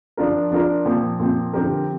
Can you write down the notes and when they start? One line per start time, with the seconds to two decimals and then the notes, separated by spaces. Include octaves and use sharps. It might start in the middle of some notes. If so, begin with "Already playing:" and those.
0.17 F3 D4 F4 A#4
0.51 F3 D4 F4 A#4
0.85 A#2 F3 C4
1.19 A#2 F3 C4
1.53 D3 F3 C4 G4 A#4